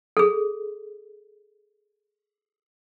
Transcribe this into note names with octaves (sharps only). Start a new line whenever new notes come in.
G#4 A4